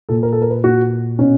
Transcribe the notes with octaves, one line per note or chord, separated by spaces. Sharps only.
A#2 A4
A#4
A4
A#4
B4
A#2 F#4
B2 C#4